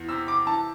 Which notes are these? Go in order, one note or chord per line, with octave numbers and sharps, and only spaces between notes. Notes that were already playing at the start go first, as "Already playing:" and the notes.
Already playing: E2
C3 E6
D6
E3 A5